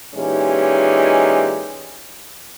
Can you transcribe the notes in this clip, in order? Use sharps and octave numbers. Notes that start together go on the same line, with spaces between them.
A#2 E3 G#3 C#4 D#4 G4